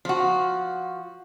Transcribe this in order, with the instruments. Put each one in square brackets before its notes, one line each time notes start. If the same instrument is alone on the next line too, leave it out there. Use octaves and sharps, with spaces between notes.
[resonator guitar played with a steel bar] F3 F#4